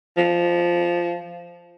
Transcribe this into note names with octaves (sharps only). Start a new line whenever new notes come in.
F3